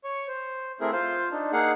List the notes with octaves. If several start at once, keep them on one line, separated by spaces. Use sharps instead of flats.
C#5 C#6
C5
A3 C4 E4 G#4 A#4
F4 C5 F5
D4 D#4
A#3 D#4 G#4 F5 F#5